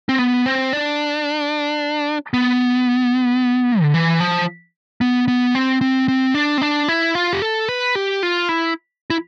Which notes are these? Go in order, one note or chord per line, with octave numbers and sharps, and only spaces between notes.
C4
B3
C4
D4
B3
D3
E3
F3
B3
B3
C4
C4
C4
D4
C4
D4
E4
F4
G4
A4
B4
G4
F4
E4
E4